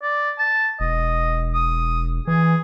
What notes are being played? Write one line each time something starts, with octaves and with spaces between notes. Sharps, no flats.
D5
A5
E1 D#5
D#6
E3 G#4